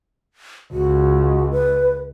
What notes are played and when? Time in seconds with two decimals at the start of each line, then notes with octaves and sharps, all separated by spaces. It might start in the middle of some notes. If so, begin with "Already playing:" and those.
0.72 C#2 F#4
1.52 B4